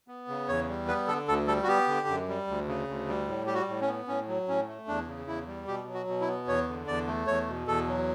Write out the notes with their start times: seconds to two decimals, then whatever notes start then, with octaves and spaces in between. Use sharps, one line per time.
0.08 B3
0.28 C#3
0.48 E2 C#5
0.68 G3
0.88 B3 B4
1.08 D3 A4
1.28 D2 A4
1.47 G3 A4
1.63 F#4
1.68 B3 G4
1.88 D3
2.07 F#2
2.28 G3
2.47 D2
2.68 C#3
2.88 D2
3.08 G3
3.28 A2
3.46 G3 G4
3.54 F#4
3.68 A2
3.81 C#4
3.87 B3
4.08 A2 C#4
4.28 F#3
4.48 A2 C#4
4.68 A3
4.88 E2 D4
5.07 C#3
5.27 E2 E4
5.47 G3
5.67 B2 G4
5.87 F#3
5.94 F#4
6.07 B2
6.21 E4
6.27 B3
6.47 E2 C#5
6.68 D3
6.87 E2 D5
7.07 A3
7.27 E2 C#5
7.47 B2
7.67 E2 A4
7.87 F#3